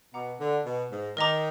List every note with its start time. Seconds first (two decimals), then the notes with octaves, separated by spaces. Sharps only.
0.14 B2 F#5 A#5 D6
0.40 D3
0.66 B2
0.92 G#2
1.17 D#3 A#4 D#5 A#5 D6